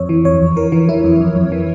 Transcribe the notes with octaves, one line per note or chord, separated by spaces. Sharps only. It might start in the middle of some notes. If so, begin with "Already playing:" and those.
Already playing: F2 C#5
E3
F2 C#5
F2
E3 A#4
E3
E3 E4
F2
F2
F2
E3